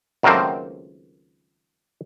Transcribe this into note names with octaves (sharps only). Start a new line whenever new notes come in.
C#2 F#2 D#3 A3 A#3 C4